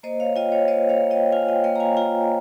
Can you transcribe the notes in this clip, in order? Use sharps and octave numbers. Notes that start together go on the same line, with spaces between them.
A#3 C5 D#5
C#5 F5
F4 D#5 G5
C#5 F5
A#3 C5 D#5
C#5 F5
A#3
D#5 G5
F4 F5 G#5
D#5 G5
A#3 D#5 G5
A#5
F5 G#5
F4 G5 A#5